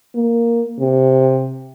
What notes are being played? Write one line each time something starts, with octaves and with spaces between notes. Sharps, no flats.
A#3
C3